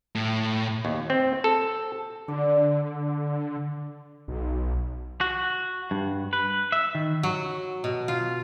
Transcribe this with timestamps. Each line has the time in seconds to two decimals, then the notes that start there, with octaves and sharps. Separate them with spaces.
0.15 A2
0.85 D#2
1.10 C4
1.44 A4
2.28 D3 D5
4.28 B1
5.21 F#4
5.91 G2
6.33 B4
6.72 E5
6.95 D#3
7.23 F#3
7.84 B2
8.08 F4